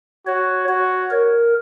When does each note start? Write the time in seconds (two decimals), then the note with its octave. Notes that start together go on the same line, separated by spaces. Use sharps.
0.27 F#4 C#5
0.68 F#4 C#5
1.10 A#4